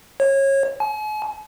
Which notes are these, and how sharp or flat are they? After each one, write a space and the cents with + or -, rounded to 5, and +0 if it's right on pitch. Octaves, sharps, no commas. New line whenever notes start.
C#5 -25
G#5 +45